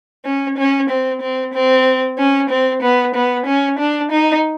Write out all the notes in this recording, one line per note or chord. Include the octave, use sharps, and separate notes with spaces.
C#4
C#4
C4
C4
C4
C#4
C4
B3
B3
C#4
D4
D#4